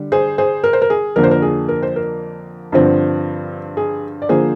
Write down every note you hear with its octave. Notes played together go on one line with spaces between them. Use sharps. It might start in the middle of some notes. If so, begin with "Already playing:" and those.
Already playing: D3 G3
G#4 C5
G#4 C5
A#4
C5
A#4
G#4
F2 D3 F3 A#3 A#4
C5
A#4
G#4
A#4
C5
A#4
G2 D3 F3 C4
G#4
D5
D3 F3 A#3 G#4 C5